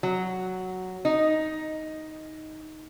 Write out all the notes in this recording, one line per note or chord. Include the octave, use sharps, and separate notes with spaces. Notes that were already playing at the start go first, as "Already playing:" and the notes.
F#3
D#4